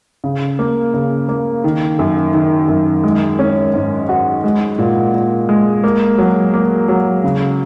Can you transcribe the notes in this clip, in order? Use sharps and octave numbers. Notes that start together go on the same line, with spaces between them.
C#3
A#3
C#3
A#3
D#3
F#2
D#3
F#2
G#3
C#4
G#2
F#4
G#3
A#2
A#2
G#3
A#3
F#3
A#3
F#3
C#3